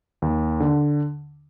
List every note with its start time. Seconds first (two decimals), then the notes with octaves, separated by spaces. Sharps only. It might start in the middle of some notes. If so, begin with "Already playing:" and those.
0.22 D#2
0.60 D3